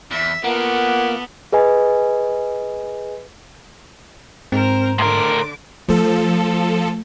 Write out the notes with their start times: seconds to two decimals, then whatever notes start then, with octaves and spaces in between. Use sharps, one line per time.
0.11 E2 E5
0.44 A#3 B3 F4 A4 F#5
1.53 G#4 B4 D#5 G#5
4.52 G#2 C4 A#4 C5
4.99 A2 D3 A#4 C6 D6
5.88 F3 A3 A4